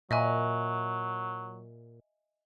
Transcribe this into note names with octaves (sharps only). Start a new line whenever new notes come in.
A#2 F#3 D#5 E5 G#5